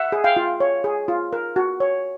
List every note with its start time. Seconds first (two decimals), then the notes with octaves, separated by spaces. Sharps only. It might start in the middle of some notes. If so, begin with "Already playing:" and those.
Already playing: E5 F#5
0.12 G#4
0.24 F5 G5
0.37 F4
0.60 C#5
0.84 G#4
1.08 F4
1.33 A#4
1.56 F#4
1.80 C#5